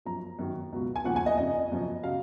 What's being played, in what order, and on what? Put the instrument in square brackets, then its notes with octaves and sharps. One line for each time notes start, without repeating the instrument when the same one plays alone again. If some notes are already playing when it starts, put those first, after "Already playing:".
[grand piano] F#2 F3 A#5
F#2 D#3 F#3
C#2 B2 F#3
G#5
D#2 C#3 F3 F#5
G#5
D#5
F2 C#3 F3 D#5
F#2 C#3 F3
C#3 F#3 F5